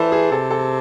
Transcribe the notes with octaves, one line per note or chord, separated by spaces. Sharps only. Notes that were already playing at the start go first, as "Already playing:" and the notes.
Already playing: E3 A4 C5 D5
G#4
C3 A4
A4